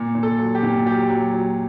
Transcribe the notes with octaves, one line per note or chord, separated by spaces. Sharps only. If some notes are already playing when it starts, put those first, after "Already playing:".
Already playing: A#2
A#2
A4
F#3
G4
A#2
F#3 G4
F#3
F#3